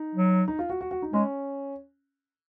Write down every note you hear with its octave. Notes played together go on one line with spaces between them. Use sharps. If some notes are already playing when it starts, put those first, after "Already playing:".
Already playing: D#4
F#3
D#4
F4
F#4
F#4
F#4
D#4
G#3 C#4